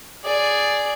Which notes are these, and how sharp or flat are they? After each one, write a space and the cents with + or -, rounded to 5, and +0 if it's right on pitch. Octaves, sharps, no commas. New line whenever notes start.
G#4 +0 D5 +0